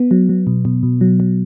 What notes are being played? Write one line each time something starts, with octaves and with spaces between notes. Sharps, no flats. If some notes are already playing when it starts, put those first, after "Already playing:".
Already playing: B3
F#3
F#3
B2
B2
B2
F#3
F#3